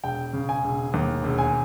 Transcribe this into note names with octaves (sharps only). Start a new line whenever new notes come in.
E1 G5
C#3
G#5
E1
D#2
E1
G#5